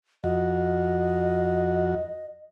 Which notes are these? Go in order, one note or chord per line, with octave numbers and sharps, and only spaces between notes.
F2 F#4 D#5